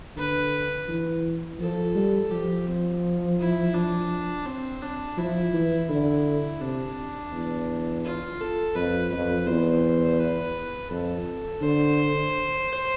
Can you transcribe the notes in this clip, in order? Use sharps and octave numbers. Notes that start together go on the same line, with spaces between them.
D3 B4
E3
F3 A4
G3
F3 G4
C4
E4
D4
C4
D4
F3 E4
E3
D3 E4
C3 D4
E2
F4
A4
F2 B4
F2 B4
E2 C5
B4
F2 A4
D3 C5